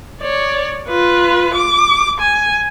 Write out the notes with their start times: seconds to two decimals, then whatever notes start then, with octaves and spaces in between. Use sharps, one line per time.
0.22 C#5 D5
0.89 F4 B4
1.55 D6
2.21 G#5